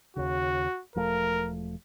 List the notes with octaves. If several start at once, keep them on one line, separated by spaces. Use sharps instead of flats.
D#2 C#3 F#4
E1 F3 A3 A#4